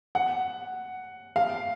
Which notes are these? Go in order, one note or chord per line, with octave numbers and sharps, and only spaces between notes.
F#5
F5